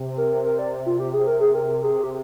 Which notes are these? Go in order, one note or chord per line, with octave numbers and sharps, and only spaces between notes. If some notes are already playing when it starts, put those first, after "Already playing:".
Already playing: C3
A#4
A#4
D5
F4
G4
G#4
A#4
G#4
A#4
G#4
G4